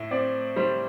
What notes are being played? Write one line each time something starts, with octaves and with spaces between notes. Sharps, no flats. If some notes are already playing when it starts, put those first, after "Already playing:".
Already playing: A2 E5
C4 D5
G3 C5